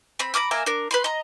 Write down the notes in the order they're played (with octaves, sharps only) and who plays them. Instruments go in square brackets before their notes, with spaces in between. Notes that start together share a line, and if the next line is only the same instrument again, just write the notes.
[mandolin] C4 B5
A#5 B5 D6 F6
A#3 E5 G#5 A#5
D4 A#4
B4 B5 C6
D#5 A#5